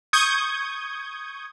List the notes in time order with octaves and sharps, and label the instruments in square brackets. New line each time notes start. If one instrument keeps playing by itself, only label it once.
[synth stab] C#6 D#6 G6 G#6